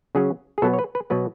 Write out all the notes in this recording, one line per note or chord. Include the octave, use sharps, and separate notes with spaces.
C#3 F#3 C#4 G#4
G#4
B2 F#3 B3 A4
C#5
B4
B4
B2 F#3 B3 B4